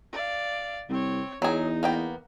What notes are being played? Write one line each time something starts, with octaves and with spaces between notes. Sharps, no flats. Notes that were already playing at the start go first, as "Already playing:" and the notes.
D5 F5
C2 C4 C#5
E2 F#3 D#4 G#4
A#3 B3 G5